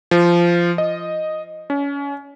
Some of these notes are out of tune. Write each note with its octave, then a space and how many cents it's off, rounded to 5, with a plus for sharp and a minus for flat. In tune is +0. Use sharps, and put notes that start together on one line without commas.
F3 -15
D#5 +0
C#4 +30